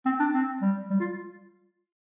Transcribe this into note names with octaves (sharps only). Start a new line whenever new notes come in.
C4
D4
C4
G3
G3
F4